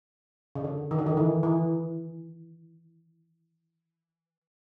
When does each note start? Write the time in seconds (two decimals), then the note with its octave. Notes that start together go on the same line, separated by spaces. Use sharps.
0.55 C#3
0.64 D3
0.91 D#3
0.98 D3
1.06 D#3
1.17 E3
1.43 E3